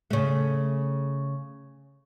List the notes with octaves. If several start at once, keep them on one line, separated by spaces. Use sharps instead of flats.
C#3 A3